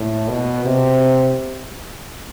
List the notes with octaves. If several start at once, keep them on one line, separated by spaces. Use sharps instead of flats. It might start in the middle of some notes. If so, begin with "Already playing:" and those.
Already playing: A2
B2
C3